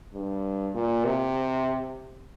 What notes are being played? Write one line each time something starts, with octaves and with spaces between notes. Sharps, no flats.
G2
A#2
C3